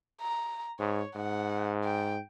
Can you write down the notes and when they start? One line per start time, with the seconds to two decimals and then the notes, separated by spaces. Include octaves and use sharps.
0.21 A#5
0.80 G#2 C#5
1.16 G#2 F#5
1.84 G5